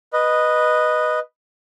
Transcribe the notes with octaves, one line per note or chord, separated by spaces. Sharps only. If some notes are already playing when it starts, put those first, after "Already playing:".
B4 D#5